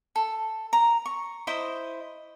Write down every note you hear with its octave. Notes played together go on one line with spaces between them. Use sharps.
A4
A#5
C#6
E4 C5 D#5